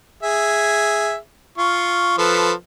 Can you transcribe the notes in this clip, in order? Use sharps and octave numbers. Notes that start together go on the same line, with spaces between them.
G#4 E5
F4 C#6
F3 A4 B4